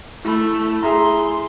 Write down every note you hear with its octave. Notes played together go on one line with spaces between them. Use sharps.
A3 E4 B5
G#4 E5 A#5 C6